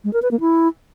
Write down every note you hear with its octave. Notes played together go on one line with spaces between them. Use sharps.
G#3
A#4
B4
A#3
E4